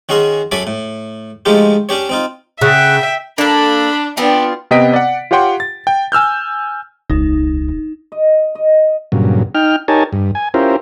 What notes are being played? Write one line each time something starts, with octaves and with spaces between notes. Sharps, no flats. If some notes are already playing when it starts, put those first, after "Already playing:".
D#3 C#4 F#4 G#4 C6
F#2 A4 C#5 G#5 B5 D6
A2
F3 G#3 A3 D#4 F4 G4
C#4 D4 G4 C#5
C4 D#4 F4
C#3 E5 F#5 G5
A#3 D4 A4 B5
F3 B3 C4 D4 F4
C3 B3 D#5 G5 B6 D7
D5 F#5
F4 G4 C#5 F#5 G5 C6
A6
G5
G#5 E6 F6 G6
E1 C#2 D#4
D#5
D#5
G2 A#2 C#3 F#3
D#4 G5 F6
D#4 G4 A#4 C#5 G#5 A5
G2
G#5
C#4 E4 F4 G4 A#4 C5